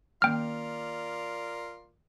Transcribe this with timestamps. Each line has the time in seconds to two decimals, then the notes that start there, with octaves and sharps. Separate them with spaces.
0.22 D#3 A#3 C#4 F4 A#4 D5 G5 F6